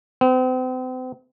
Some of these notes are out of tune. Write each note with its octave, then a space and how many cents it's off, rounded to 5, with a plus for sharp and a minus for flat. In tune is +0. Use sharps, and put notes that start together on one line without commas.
C4 -40